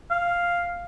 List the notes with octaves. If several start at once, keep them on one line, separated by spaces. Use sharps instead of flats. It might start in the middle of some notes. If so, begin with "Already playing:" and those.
F5